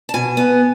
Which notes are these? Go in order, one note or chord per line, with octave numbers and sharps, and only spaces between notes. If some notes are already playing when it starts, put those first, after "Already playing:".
A5
B2 G#5
B3